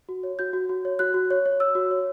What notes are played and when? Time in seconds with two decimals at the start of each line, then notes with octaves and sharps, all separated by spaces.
0.09 F#4
0.23 C#5
0.39 F#4 G6
0.53 F#4
0.69 F#4
0.85 C#5
0.99 F#4 F#6
1.14 F#4
1.31 C#5
1.46 C#5
1.60 C#5 E6
1.75 F#4
1.91 C#5